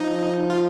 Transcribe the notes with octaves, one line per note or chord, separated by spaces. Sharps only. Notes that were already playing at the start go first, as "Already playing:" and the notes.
Already playing: F3 D#4
F4